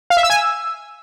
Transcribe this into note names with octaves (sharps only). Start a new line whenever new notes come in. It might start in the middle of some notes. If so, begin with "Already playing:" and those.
F5
E5
E6
G#5
E6